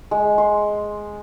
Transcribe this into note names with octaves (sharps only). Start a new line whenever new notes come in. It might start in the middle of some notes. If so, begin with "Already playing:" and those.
G#3
C6